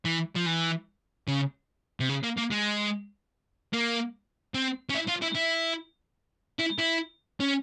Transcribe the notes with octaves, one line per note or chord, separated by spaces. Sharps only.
E3
F3
E3
C#3
C3
C#3
A#3
A#3
G#3
A#3
C4
C#4
E4
F4
E4
E4
E4
E4
C#4